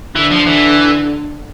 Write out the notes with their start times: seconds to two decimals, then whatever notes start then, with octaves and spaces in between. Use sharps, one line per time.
0.16 D3 E3
0.31 F3
0.47 E3